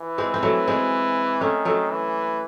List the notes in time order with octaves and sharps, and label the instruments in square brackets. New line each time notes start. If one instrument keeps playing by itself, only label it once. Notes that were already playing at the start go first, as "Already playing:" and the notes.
Already playing: [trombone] E3
[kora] G#3 C4
C4
F#3 A3
G#3 C4
[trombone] D#3 [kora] A3 C#4
[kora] F#3 A3
[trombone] E3